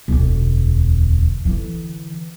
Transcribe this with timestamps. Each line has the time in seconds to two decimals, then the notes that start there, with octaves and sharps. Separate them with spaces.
0.08 E1 D2
1.45 D3 E3